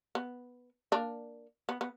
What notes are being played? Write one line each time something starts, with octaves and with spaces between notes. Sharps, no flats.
B3
A#3 D4
B3
B3